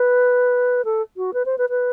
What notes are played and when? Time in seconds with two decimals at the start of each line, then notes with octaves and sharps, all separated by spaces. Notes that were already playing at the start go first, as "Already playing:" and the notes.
Already playing: B4
0.85 A4
1.17 F#4
1.34 B4
1.46 C5
1.58 B4
1.70 B4